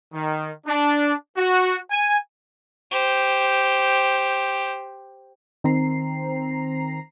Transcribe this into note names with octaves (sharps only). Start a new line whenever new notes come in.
D#3
D4
F#4
G#5
G4 C5
D#3 C4 A#5 C7